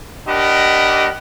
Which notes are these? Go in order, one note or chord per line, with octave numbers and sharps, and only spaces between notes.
D4 G4 A#4 D#5 F#5 B5